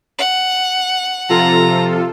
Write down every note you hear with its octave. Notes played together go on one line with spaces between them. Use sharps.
F#5
C3 F3 F4 A4 A#5